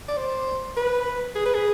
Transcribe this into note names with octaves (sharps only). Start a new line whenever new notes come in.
D5
C5
B4
G#4
B4
G#4